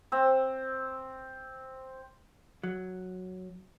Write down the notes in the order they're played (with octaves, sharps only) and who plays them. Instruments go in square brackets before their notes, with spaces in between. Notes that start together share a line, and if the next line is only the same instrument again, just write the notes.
[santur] C4 E6
[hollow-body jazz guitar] F#3